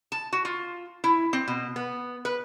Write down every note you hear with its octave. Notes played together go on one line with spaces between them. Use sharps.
A5
F#4
F4
E4
C4
B2
B3
B4